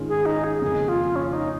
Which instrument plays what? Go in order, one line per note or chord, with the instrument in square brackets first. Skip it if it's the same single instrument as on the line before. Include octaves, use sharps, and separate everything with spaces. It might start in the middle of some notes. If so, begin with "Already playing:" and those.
Already playing: [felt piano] G#2 D#3 G#3 C#4 F4
[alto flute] G#4
D#4
G#4
[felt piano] F2 C#3 A#3 [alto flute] G#4
[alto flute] F4
C#4
D#4